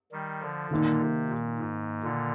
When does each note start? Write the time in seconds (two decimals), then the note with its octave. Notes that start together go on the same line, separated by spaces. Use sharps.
0.12 D#3 G3
0.41 D3 F3
0.70 A#2 D3 D#3 A#3 D#4
1.01 C3
1.29 A#2
1.59 G#2
2.03 A#2 D3